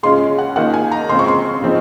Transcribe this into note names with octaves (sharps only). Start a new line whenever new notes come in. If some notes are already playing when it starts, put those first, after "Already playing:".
C#3 G#3 C#4 F4 C6
F#5
D#3 A#3 F4 F#5
G#5
A#5
C#3 G#3 C4 F4 C6
C#6
C6
C#3 F3 C4 D#4